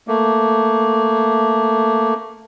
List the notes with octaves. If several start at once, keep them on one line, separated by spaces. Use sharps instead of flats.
A3 A#3